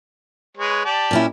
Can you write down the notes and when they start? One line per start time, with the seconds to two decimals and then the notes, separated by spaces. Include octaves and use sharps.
0.57 G#3 B4 C#5
0.85 G4 D5 A5
1.11 A#2 C#4 E4